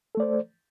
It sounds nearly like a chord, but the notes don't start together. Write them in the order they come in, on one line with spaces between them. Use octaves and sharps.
A4 A3 D5 C5